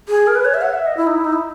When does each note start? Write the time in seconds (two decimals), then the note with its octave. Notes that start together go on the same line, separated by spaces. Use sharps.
0.09 G#4
0.27 A#4
0.35 B4
0.45 C#5
0.54 E5
0.62 F#5
0.74 E5
0.86 D#5
0.97 E4
1.07 D#4
1.15 E4
1.25 D#4
1.33 E4